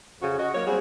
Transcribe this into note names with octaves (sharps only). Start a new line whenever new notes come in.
F2 C#3 C#4 F#4 F#5
F#4 D#5
F#3 A#3 C#5
G3 C4 F#4 G#4